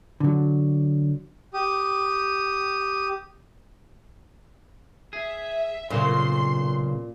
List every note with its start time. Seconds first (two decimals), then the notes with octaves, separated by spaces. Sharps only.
0.20 D3 F#3
1.54 G4 D#6
5.13 G#4 E5
5.90 B1 A#2 C#3 C5 C6